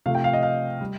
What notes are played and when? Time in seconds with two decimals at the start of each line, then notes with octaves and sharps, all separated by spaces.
0.06 C3 F3 A3 F5
0.15 G5
0.24 F5
0.33 D#5
0.43 F5
0.81 G3